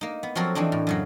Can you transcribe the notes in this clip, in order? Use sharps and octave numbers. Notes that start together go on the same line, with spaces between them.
A#3 D#4
B3
F3 F#3 C4 F#4 A4 A#4
E3 C4 D4 D#4
A2
F#2 C#3 F#3